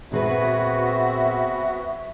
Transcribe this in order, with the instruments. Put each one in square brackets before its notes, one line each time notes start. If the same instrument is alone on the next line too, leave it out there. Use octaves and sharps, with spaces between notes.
[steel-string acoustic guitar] A#2 G#4 B4 [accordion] B3 F#4 [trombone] C4 [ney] E5